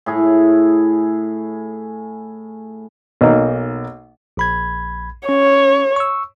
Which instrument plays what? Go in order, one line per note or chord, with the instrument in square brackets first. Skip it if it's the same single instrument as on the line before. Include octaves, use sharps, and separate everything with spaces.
[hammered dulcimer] A2 G#4
[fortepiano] B1 A#3 D#4
[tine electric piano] A#1 B5 G#6
[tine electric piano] C#4 [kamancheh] C#5
[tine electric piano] C#6 E6